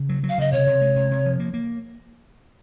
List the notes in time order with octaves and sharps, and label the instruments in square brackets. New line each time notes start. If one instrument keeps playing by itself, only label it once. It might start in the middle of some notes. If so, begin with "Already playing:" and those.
Already playing: [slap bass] C#3
F#3
F#3
[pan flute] F5
[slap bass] C#3 [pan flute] D#5
[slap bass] C3 [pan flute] C#5
[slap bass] C3
G#3
C3
C3
F3
A#3
A#3